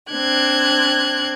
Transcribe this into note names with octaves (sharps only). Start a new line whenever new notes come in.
C4 D4 F#6 G#6